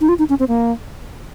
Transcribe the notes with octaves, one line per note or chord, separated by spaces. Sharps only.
D#4
F4
D#4
C#4
C4
A#3